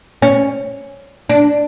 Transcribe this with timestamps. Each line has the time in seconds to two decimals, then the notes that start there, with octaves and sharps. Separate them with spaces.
0.22 C#4
1.29 D4